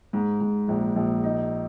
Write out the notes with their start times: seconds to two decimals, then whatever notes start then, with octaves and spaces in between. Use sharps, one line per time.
0.13 G#2
0.41 G#2
0.68 A#1
0.96 A#1
1.24 D#4